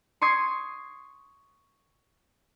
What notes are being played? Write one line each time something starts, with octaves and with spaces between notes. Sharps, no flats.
C6 C#6 D#6 G#6 C7